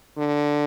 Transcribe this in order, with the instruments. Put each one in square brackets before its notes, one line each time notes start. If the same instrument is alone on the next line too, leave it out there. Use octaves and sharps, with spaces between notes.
[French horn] D3